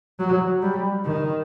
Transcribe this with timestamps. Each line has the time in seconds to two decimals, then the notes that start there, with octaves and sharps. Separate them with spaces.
0.19 F#3
0.62 G3
1.04 D#3